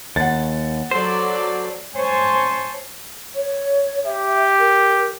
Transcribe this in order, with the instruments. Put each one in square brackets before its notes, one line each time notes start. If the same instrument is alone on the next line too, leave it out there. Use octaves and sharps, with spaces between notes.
[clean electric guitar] D#2 [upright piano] F#5 A6
[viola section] F#3 A4 D5 [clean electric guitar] C5
[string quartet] C5 C#5 G#5 A5 C6 C#6
[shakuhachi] C#5
[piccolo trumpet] G4 [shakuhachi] E5
[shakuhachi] A#4